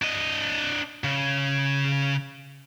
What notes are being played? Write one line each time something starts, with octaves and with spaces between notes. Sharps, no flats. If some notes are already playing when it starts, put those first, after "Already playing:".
D4 D#5
C#3